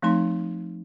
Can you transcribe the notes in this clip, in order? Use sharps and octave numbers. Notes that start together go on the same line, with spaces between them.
F3 A3 C4 D#4 C6